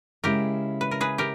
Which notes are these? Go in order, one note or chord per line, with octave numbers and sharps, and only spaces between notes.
C#3 G#3 C#4 E4 G4 A#4
B4
A#4
G#4 B4
G4 A#4